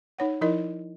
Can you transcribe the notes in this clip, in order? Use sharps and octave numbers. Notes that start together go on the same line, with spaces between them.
D#4 C#5 F#5
F3 D#4 E4 A#4 D#5